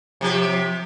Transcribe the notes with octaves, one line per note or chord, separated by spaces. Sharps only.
C3 F3 G4